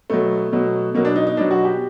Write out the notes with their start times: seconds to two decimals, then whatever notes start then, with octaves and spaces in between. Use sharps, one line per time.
0.10 B2 F#3 A3
0.53 B2 F#3
0.94 B2 F#3 A#3
1.05 D4
1.16 D#4
1.27 D#4
1.37 B2 F#3 D4
1.51 F#4
1.65 G4